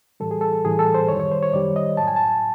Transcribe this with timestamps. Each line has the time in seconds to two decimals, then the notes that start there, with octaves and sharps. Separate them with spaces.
0.20 A2 E3 G3 A4
0.31 G#4
0.41 A4
0.65 A2 E3 G3 G#4
0.79 A4
0.94 C5
1.09 F#2 D#3 G3 C#5
1.20 C#5
1.32 C5
1.43 C#5
1.53 F#2 D#3 G3 D5
1.76 D#5
1.97 A2 F#3 A5
2.07 G#5
2.16 A5